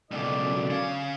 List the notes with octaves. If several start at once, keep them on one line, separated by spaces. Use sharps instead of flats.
C#2 F#2 B2 D3 D5
C#4 F5